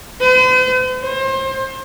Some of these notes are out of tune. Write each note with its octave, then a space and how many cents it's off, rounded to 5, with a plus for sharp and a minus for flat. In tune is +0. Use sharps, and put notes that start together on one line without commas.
C5 -45
C5 +30